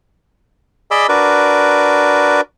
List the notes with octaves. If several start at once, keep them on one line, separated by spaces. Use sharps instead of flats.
G#4 D5 D#5 B5 D6 E6
D4 F#4 A#4 B4 D5